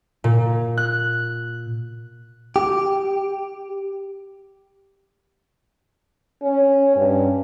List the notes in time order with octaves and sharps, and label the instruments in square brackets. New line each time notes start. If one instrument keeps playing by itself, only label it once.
[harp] A#2
F#6
[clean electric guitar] G4
[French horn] C#4
G2